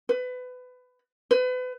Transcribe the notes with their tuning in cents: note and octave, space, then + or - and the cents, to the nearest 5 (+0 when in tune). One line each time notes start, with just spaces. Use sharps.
B4 +25
B4 +35